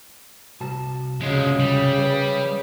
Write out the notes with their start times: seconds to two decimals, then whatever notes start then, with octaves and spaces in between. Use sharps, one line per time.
0.61 C2 F#4 A5
1.21 C#3 F3 G#3
1.60 G3
1.99 G#4 B4 C#5